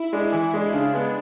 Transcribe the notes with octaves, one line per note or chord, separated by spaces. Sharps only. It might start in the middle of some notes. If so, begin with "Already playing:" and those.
Already playing: E4
G#3 D4
E3 E4
G#3 D4
C#3 D4
G#3 B3